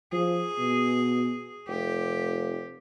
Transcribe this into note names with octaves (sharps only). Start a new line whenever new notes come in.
F3 G#4
B2
F1 G4